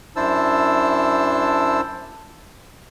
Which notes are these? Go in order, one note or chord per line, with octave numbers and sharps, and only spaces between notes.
F#2 D4 E4 C5 A5 E6